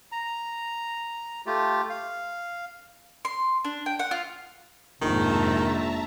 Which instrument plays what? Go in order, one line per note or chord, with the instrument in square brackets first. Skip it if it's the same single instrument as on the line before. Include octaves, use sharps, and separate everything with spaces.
[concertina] A#5
A3 F4 G4
F5
[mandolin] C6
D4
G5
F#5
F4
[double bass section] F1 F2 G#2 [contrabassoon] A#1 [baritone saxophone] D#3 [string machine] E5 A5 A#5